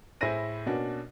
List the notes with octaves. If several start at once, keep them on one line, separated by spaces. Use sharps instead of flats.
A2 E4 G#4 C5 A#6 D#7
B2 A#3 C#4 D4 F#4